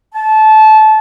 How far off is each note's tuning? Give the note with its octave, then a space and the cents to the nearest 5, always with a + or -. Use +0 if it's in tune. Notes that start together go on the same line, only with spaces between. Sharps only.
A5 -20